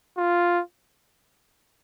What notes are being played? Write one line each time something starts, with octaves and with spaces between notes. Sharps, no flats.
F4